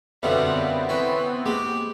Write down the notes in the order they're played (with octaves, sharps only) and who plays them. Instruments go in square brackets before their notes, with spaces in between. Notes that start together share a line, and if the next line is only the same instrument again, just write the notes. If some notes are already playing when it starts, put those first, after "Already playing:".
[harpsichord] F#2 B2 D3 [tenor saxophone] G3 [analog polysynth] B3 C4 [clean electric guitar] E5 F5
[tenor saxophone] E3 [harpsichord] C#4
[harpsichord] G#3 [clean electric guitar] A#3 [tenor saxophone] G4